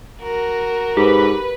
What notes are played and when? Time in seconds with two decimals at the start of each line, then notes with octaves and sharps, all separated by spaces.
0.21 F#4 A#4
0.97 G#2 G4 B4